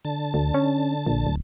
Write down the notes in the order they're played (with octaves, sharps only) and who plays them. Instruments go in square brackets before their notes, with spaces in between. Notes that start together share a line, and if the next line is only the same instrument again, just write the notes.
[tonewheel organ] D3 A5
[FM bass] D2
C#4
A#1
D1